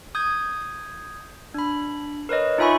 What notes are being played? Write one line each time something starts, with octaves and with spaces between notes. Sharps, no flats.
D#6 G6 G#6
D4 B5
A#4 B4 C#5 D#5
D#4 F4 E5 G#5 B5 C#6